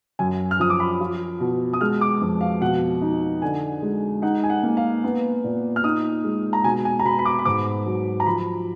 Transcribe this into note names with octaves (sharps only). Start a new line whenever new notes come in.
F#2 G#5
F6
F3 D#6
D6
B5
F4
B2
D#6
G#3 F6
D6
F2
F5
B2 F#5
D#4
D3 G#5
G#3
D#4 F#5
G#5
F#5
A#3
F5
B3
A#2
F6
D#4 D#6
G#3
A#5
B2 G#5
G#5
A#5
B2 B5
B5
D6
B5
G#2 D6
F#3
A#5
F3 B5